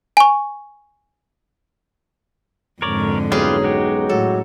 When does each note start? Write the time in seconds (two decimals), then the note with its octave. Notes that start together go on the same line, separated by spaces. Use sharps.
0.17 G#5 C#6
2.82 F2 G#2 D3 A#4 C#5 D5
3.32 B1 C#4 D#4 F4 G4 G#4 B4
3.64 G#3 F#4 G4
4.09 A2 F#3 A4